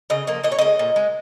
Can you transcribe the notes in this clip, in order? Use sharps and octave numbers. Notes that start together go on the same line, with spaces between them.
C#3 D#5
F3 A#3 D#5
A#2 D#5
C#5
G#3 D#5
A#2
G#3